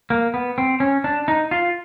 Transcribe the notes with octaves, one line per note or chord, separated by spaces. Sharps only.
A#3
B3
C4
C#4
D4
D#4
F4